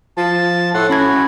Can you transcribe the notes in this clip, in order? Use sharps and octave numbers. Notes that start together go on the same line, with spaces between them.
F3 A5
A2 A4 F#5 C6
C#4 F#4 B5 G#6